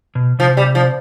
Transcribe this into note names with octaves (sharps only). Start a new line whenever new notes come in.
B2
C3 F3
G3
F3